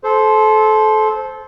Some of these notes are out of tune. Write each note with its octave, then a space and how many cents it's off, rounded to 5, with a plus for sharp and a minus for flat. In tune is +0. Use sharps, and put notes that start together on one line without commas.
A4 -25 C5 +0